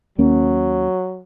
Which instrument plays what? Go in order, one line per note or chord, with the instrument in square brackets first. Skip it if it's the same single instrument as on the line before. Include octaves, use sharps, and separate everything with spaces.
[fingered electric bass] D#2 A#3 C#4 [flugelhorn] F#3